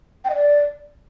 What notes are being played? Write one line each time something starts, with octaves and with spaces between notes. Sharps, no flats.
G5
D#5
D5